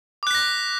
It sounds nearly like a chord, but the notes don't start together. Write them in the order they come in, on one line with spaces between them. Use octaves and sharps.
D6 F#6 B6 A#6